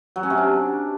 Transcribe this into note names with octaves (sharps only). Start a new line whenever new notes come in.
F#3
C#4
C3
D4